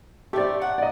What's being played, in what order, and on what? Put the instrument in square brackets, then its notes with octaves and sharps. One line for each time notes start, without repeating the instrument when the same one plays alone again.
[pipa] A3 C4 [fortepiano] G4 D5
[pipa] F#3 F#5
[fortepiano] D5 D#5